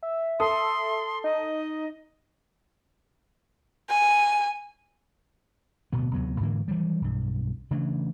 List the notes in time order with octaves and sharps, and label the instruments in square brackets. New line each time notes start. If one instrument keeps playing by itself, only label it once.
[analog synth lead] E5
[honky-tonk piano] A4 D#6 [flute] C6
[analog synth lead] D#4 [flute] D#5
[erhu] G#5
[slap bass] D1 B2 B3
D2 C3 F#3 B3
G#2 D3 E3 A#3
D#3 E3 F#3 G3
B1 G2
C#3 E3 A3 D4